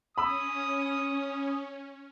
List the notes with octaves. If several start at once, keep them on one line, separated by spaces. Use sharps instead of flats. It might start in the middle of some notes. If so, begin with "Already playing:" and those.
C#4 B5 D#6 E6